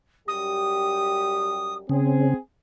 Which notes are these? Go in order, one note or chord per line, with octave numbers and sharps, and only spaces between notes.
F#2 G3 G4 D#6
C#3 C4 G#4